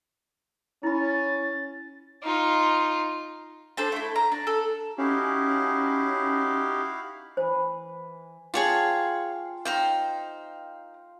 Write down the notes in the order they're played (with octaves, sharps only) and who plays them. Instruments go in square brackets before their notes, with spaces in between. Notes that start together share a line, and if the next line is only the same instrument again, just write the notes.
[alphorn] C#4 [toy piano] E4 B5 [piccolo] A6
[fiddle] D#4 F4
[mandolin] D4 A4 C5 A5
A3 E4
A#5
D4
A4
[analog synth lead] C#4 [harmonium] D#4 G4 [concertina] E4 F#4 F5
[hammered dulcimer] E3 B4 [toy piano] C5
[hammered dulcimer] F4 G5 [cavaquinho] G#4 C#5 A5
[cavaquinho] D#4 C5 G5 [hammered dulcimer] F5